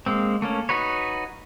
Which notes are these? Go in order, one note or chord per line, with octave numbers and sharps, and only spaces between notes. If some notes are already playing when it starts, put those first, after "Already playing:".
G#3 A#3 C4
A3 A#3 C#4
D#4 F#4 B4 C#5